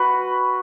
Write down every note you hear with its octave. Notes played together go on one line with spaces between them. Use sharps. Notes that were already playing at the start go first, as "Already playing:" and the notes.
Already playing: F#4 B4